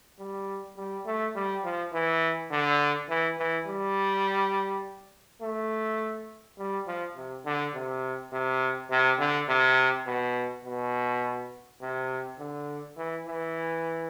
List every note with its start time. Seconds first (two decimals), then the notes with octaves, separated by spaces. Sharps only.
0.19 G3
0.77 G3
1.06 A3
1.35 G3
1.64 F3
1.93 E3
2.51 D3
3.09 E3
3.38 E3
3.67 G3
5.42 A3
6.58 G3
6.87 F3
7.16 C3
7.45 D3
7.74 C3
8.32 C3
8.91 C3
9.19 D3
9.49 C3
10.06 B2
10.65 B2
11.82 C3
12.39 D3
12.97 E3
13.26 E3